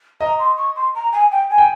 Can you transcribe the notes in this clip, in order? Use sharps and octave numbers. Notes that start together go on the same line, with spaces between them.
D#5 A#5
C6
C#6
C6
A#5
G#5
G5
G#5
G5